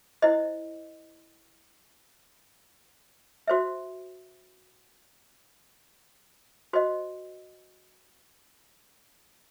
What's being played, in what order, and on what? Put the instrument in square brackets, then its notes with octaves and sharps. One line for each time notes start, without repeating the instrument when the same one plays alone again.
[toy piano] E4 C5 D#5
F#4 C5 E5
F#4 C5 D#5